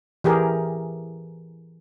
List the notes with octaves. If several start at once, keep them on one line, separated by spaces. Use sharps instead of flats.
E3 G4 G#4 A#4